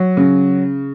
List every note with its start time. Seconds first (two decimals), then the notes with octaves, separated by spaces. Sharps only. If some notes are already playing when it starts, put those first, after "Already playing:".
Already playing: F#3
0.17 C#3